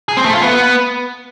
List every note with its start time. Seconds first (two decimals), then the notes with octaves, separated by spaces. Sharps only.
0.09 G#4
0.17 C4
0.25 A3
0.34 F4
0.42 B3